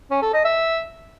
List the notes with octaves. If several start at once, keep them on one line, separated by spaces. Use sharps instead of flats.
C#4
A4
D#5
E5